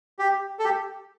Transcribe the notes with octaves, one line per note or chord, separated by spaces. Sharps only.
G4
A4
G4